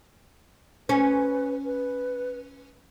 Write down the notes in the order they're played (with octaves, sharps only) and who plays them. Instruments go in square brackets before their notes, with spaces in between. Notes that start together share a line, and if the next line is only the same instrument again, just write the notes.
[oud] C#4 [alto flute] B4
[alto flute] B4